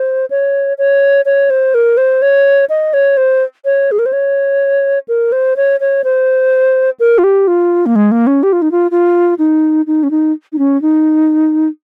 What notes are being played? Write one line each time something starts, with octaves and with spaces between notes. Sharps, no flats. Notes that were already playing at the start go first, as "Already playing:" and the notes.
Already playing: C5
C#5
C#5
C#5
C5
A#4
C5
C#5
D#5
C#5
C5
C#5
G#4
A#4
C5
C#5
A#4
C5
C#5
C#5
C5
A#4
F4
G4
F4
A#3
G#3
A#3
C#4
G4
F4
D#4
F4
F4
D#4
D#4
C#4
D#4
D#4
C#4
D#4